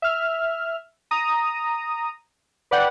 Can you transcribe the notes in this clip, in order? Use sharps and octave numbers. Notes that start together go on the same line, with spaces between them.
E5 F6
A#5 D#6
B4 D5 F#5 G5